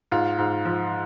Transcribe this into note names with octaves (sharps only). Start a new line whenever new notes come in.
G#2 F4
G#2
F3